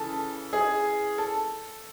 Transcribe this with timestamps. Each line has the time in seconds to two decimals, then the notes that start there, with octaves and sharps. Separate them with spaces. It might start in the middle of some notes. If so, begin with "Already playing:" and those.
Already playing: C#3 E3 A4
0.53 G#4
1.18 A4